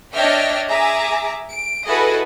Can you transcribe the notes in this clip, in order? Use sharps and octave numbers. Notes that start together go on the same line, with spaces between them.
D4 C#5 D#5 E5 G5 F6
G#4 E5 G#5 A#5 D6
D7
E4 F#4 G#4 A4 B4 D#5